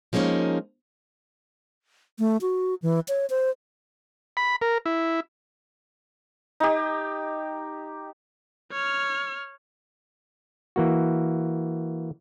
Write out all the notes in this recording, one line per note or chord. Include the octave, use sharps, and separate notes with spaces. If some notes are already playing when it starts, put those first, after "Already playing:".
F3 G#3 A#3 C#4 D#4
A3
F#4
E3
C#5
C5
B5
A#4
E4
D#4 G4
C#5 F6
E3 A#3 F#4